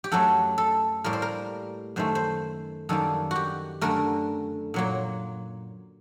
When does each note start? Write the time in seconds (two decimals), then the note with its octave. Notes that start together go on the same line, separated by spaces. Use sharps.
0.04 G4
0.12 F#2 F#3 A3 A4
0.58 A4
1.04 A2 G3 A#3 A#4
1.13 C5
1.22 A#4
1.96 F#2 D#3 A3 C5
2.15 C5
2.89 F#2 D#3 G3 A#3 A4
3.31 F#4 G4
3.81 F#2 D3 A3 A#4
4.74 A#2 F#3 A#3